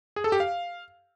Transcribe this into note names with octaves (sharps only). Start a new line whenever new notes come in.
G#4
A4
G4
F5